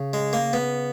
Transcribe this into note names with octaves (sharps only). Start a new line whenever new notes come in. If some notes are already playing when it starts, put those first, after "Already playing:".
Already playing: C#3
G#3
A#3
B3